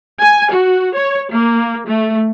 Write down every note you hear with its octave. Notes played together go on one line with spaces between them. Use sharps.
G#5
F#4
C#5
A#3
A3